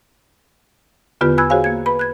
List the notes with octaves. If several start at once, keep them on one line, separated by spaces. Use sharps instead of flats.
E2 D3 B3 F4 G4 B4
G#5 B5 E6 F#6 G#6
F#4 G#4 C5 C#5 F5 G#5
A#3 G#6
B4 B5
F#6 G#6